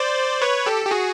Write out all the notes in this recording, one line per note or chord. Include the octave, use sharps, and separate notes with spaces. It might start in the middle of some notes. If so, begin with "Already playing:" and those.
Already playing: C5 D5
B4 C#5
G4 A4
G4
F#4 G#4